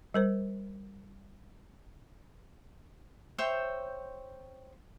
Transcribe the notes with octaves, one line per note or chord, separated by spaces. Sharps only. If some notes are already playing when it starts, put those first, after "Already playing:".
G3 A#4 C5
C5 C#5 E5 G5